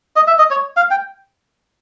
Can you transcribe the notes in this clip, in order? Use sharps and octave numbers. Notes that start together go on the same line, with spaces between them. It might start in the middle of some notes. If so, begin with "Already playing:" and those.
D#5
E5
D#5
C#5
F5
G5